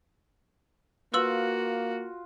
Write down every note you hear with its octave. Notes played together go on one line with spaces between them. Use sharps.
A#3 F4 F#4 B4 E6 F#7